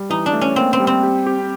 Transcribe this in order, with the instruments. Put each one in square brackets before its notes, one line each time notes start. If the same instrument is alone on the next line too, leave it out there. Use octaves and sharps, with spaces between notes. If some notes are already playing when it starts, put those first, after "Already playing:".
Already playing: [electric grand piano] G3
[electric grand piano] E3 [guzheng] D#4
[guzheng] D4
[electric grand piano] A3
[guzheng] C#4
[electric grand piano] A#3 [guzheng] C4
[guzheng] C4
[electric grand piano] G3
[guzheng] C4
[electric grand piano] G4
G4